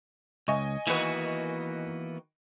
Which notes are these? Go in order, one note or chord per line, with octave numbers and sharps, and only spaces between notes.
C#2 D#5 G#5 C#6
D#3 E3 A#3 B3 F#4 B4